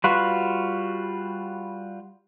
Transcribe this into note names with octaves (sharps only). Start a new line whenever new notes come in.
G3 F4 F#4 B4